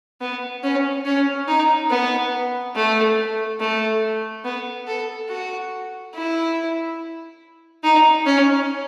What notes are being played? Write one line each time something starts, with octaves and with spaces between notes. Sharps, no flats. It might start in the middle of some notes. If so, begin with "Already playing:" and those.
B3
C#4
C#4
D#4
B3
A3
A3
B3
A4
F#4
E4
D#4
C#4